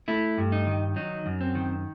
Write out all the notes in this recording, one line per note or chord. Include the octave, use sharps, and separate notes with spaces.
A3 E4
G2
D#4
D#3
F#3 D#4
F#2
C4
D#3